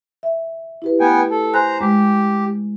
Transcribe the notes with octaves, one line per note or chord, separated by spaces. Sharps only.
E5
E4 G4 B4
A3 B3 G5 G#5
A4
C5 G#5 A#5 F#6
G#3 G4